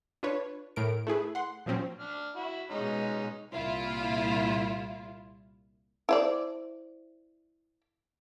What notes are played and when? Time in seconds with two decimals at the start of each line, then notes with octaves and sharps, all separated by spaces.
0.23 D4 F4 B4 C#5
0.76 A2 A#4 D7
1.07 A3 E4 G#4 B4
1.35 F#5 C6
1.66 A#2 F3 F#3 C4 C#4
1.99 D4 F6
2.36 E4 F#4
2.70 B2 G#3 C#4 D#4
3.52 C2 A#2 E4 F4
6.09 E4 C5 D5